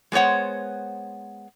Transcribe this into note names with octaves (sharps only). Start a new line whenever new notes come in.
G#3 B3 C5 C#5 F#5